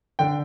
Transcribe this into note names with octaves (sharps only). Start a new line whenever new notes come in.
D3 G5